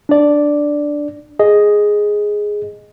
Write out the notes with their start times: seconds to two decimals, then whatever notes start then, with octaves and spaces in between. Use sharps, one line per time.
0.09 D4 D5
1.39 G#4 D#5